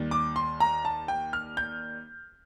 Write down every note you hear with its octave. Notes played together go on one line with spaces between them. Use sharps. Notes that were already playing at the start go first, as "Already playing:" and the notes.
Already playing: D#2 D#3 G3
D6
C6
A#5
A5
G5
F6
G6